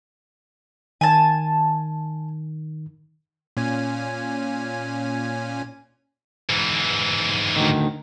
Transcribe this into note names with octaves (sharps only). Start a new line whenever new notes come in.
D#3 G#5 A5
A#2 C#4 G#5
G#2 E3
D2 D#3